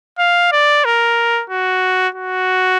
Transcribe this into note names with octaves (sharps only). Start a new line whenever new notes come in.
F5
D5
A#4
F#4
F#4